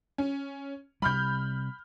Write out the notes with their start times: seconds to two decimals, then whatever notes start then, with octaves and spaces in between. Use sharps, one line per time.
0.18 C#4
1.02 C3 G3 B5 F6 G6